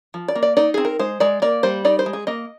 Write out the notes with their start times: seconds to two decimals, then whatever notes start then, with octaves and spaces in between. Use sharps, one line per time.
0.14 F3
0.28 D5
0.35 A#3
0.43 D5
0.57 D#4 D5
0.74 C4 G#4
0.85 A#4
0.99 G#3 C5
1.20 G#3 D5
1.42 A#3 D5
1.63 G3 C5
1.85 D#4 D5
1.99 C5
2.06 G#3
2.13 G#4
2.27 A#3 D#5